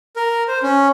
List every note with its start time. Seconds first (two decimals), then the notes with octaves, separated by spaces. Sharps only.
0.16 A#4
0.48 C5
0.63 C#4